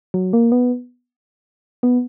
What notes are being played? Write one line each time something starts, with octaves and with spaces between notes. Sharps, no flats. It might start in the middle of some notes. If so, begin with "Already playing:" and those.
F#3
A#3
B3
B3